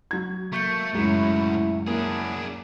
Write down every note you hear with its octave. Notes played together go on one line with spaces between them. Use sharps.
F#3 G#6
A3 A#3 C#6 G6 C#7
C#2 F#2 A2 F#3 E4
F#3 A#3 D4 E4 G#4 A#4